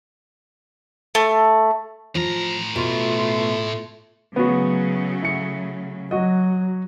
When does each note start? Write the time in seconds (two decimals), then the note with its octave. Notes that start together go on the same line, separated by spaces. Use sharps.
1.15 A3
2.15 A2 F3 A#5
2.76 B2 A3 F4
4.36 C#3 F#3 A3 B3 F#4
5.23 E4 C#7
6.11 F#3 F#4 D#5